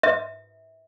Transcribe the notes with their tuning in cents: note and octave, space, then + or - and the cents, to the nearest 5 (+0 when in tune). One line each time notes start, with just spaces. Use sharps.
E5 -25